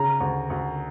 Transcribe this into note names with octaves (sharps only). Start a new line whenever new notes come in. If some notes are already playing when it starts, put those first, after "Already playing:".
Already playing: C#3 A#5
D2
D2